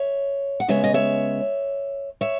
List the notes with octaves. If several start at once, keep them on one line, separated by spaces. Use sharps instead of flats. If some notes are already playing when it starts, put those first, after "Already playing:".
Already playing: C#5 E5
F#5
C#3 G#3 B3 C#5 E5
D#5
C#5 E5
C#5 E5